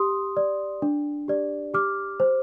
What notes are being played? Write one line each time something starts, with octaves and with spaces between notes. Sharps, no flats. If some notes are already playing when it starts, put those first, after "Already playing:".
Already playing: G4 C6 D#6
D5
D4
G4 D5
G4 D6 F6
C5